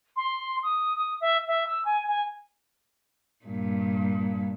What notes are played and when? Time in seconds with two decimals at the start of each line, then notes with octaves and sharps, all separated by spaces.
0.16 C6
0.63 D#6
0.96 D#6
1.20 E5
1.47 E5
1.67 E6
1.85 G#5
2.07 G#5
3.45 G2 A#2